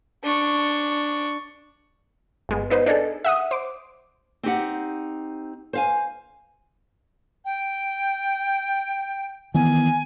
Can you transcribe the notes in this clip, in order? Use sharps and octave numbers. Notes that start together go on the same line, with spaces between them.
D4 C#6
G1 G#3 B3
B3 D#4 B4 C5
D4 D#4 G#4 A4
E5 F#5 D#6
C5 D6
C4 D#4 G4 F#5
C5 F5 G#5
G5
D#3 E3 B3 G#5